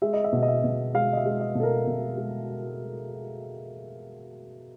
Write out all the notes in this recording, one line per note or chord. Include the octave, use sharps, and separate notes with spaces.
G#3 E5
D#5
E5
B2
D#5
E5
B2
G#3 F5
D#5
E5
G#3
D#5
B2 A4
A#4
B2
G#3